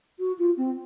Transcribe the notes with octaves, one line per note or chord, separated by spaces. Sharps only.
F#4
F4
C4